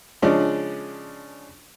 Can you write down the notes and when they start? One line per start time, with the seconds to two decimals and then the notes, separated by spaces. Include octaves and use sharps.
0.22 C#3 F3 G#3 C#4 D4